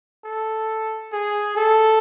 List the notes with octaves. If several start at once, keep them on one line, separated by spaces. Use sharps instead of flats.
A4
G#4
A4